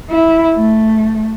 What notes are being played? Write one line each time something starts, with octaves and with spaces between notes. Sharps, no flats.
E4
A3